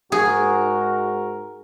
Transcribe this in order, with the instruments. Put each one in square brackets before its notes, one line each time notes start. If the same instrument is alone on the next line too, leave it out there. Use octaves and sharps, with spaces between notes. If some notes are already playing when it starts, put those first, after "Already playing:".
[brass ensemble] G#2 A#4 [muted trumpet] F#4 [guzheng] G#4